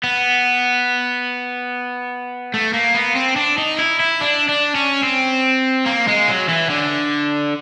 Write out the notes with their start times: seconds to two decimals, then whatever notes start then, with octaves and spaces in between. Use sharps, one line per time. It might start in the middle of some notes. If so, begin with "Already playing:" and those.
0.04 B3
2.54 A3
2.73 A#3
2.94 B3
3.15 C4
3.36 D4
3.58 D#4
3.78 E4
3.99 E4
4.21 D4
4.48 D4
4.75 C#4
5.04 C4
5.86 A#3
6.08 G#3
6.28 F#3
6.49 E3
6.70 D3